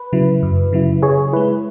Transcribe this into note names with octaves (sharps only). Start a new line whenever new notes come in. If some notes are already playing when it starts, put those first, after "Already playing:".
Already playing: B4
C#3 F#3 E4
F#2
C#3 F#3 E4
C#3 G#4 C#5
G#3 E4 B4